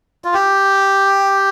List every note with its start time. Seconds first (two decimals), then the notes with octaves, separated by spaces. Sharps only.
0.25 F4
0.34 G4